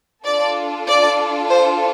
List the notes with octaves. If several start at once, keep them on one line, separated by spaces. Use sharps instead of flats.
D4 F4 A4 D5
D5
C5